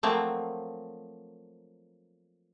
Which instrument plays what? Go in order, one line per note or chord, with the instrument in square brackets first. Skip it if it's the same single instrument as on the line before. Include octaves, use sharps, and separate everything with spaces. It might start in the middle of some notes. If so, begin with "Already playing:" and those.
[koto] F3 F#3 A3 A#3 C4